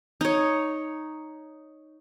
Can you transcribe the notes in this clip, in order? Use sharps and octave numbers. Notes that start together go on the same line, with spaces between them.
D#4 C#5